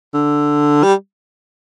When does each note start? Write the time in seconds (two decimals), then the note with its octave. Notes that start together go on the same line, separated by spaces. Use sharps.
0.14 D3
0.83 G3